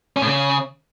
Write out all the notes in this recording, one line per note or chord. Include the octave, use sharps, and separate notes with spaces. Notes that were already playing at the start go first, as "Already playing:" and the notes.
C#4
A2
C#3